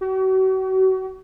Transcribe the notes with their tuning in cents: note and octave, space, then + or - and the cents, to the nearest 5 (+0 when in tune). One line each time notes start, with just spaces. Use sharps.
F#4 +35